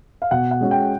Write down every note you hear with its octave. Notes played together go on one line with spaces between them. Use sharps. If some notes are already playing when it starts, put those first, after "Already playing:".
F5
B2 F#5
F#5
G#3 C#4 F#4
G5